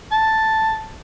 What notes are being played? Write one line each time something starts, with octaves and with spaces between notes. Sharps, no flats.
A5